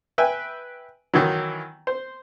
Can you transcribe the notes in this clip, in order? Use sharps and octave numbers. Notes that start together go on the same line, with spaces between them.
B4 E5 G5 G#5
D#3 E3 F#3
C5